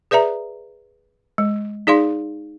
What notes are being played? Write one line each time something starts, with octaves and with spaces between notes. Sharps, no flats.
G#4 B4 D5 E5 A#5
G#3
D#4 G#4 D5 F5 C6